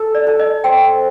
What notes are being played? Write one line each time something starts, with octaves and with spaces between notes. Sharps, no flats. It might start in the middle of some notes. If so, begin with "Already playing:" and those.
Already playing: A4
D5
A4
D#5
C4 G5